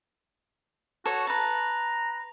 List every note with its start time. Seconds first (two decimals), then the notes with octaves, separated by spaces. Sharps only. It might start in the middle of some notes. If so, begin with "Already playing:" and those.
1.06 F#4 A4 C#5
1.27 B4 A5 A#5